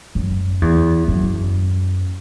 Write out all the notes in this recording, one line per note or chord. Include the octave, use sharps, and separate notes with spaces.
F#2
E2
F#2